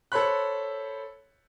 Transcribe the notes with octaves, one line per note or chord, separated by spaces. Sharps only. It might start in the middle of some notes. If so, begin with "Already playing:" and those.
A4 C5 C#5 B5 F#6